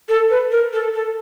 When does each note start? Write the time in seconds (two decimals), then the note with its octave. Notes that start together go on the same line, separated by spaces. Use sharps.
0.08 A4
0.29 B4
0.50 A#4
0.72 A4
0.94 A4